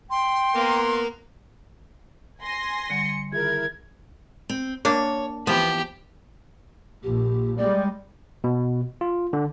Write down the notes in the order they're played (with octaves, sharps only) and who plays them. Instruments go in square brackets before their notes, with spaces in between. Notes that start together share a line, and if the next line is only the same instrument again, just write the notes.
[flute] G5 [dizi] C6
[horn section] A#3 B3
[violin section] G#5 C6 A#6
[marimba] D3 G3 F#5 [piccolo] C#7
[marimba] D#3 F4 G#4 [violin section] E4 A#4 [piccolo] G#6
[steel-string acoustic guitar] C4
[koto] A#3 D4 [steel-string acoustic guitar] C#5
[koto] E3 F3 [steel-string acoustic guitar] B3 [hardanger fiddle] G4
[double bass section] A#1 [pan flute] G4
[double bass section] G3 G#3 [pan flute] D5
[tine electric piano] B2
F4
D3